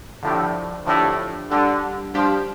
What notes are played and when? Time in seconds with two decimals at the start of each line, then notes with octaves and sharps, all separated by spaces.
0.23 A2 D3 F3 D4 G4
0.86 A2 D3 F3 D4 G4
1.50 D3 G3 D4 G4
2.14 F3 G3 D4 G4